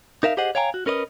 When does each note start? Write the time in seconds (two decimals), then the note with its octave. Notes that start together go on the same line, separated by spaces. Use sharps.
0.23 D#4 A#4 E5 F5
0.37 G4 G#4 C5 D#5 F#5
0.55 C#5 F5 G5 G#5 A#5
0.74 F#4
0.86 C#4 A#4 B4 D5 D#5